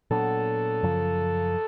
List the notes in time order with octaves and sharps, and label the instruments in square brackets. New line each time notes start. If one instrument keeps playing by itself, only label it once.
[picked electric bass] A#2 F#3 B3 D4 [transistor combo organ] A4
[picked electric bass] F#2 C#3 F3